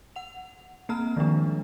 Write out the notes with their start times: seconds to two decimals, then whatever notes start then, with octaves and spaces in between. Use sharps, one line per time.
0.16 F#5 F7
0.89 A#3 C4 A#5 F6
1.16 D#3 F3 G3 G#3 D4